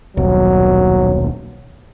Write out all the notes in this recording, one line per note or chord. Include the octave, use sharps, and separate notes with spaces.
D#1 B1 F#3